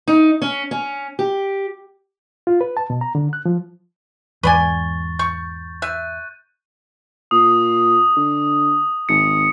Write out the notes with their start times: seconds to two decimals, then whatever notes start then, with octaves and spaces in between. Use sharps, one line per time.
0.08 D#4
0.42 C#4
0.71 C#4
1.19 G4
2.47 F4
2.61 B4
2.77 A5
2.90 B2
3.01 A#5
3.15 D3
3.33 F#6
3.46 F3
4.43 E2 G#2 B4 D5 G#5 C#6 A6
5.19 C#6 G6
5.82 E5 F#6 G6 D#7
7.31 A#2 D#6
8.16 D3
9.09 G#1 C#7